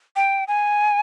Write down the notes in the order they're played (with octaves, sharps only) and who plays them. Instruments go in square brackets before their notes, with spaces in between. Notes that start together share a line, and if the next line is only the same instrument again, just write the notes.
[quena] G5
G#5